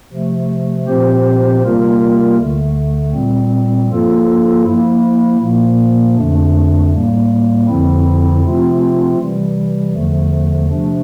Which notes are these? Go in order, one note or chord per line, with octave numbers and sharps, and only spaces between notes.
C3 F3 A3
A#2 F3 C4 G4 C5
C3 G3 A#3 F4 A#4
D2 D3 A3
A#2 G3 C4
G2 F3 A#3 F4 A4
F3 A#3 E4
A#2 F3 A#3
F2 D3 A3 D4
A2 G3 A#3
F2 D3 F3 C4 E4
C3 F3 A3 C4 F4
C3 E3 G3
E2 D3 F3 A3
C3 F3 A3 D4